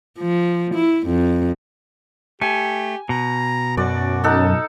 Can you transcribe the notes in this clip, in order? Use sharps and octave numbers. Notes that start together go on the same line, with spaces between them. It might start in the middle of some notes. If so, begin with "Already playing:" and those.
F3
E4
F2
A3 G4 G#5
B2 A#5
F#2 F#4 D5
D#4 A4 F#5